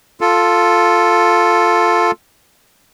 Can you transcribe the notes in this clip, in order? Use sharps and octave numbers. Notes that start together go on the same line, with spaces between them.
F4 A4